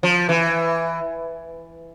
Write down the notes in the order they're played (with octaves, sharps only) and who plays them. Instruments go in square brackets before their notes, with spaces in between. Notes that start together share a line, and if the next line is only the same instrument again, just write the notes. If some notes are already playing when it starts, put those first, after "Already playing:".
[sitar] F3
E3